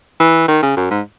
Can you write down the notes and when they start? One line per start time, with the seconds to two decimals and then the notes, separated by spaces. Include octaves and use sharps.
0.20 E3
0.48 D#3
0.62 C#3
0.77 F#2
0.91 G#2